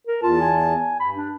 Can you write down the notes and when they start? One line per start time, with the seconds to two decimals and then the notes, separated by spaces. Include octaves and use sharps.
0.07 A#4
0.23 E2 F4 A5
0.41 G#5
1.00 G2 B5
1.15 D4